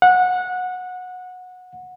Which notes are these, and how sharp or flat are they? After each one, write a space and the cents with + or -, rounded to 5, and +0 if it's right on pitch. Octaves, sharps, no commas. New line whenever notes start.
F#5 -20